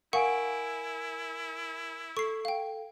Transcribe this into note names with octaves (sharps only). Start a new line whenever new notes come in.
E4 A#4 F5 F#5 G#5 C#6 D7
A4 C#6 C7
F5 G5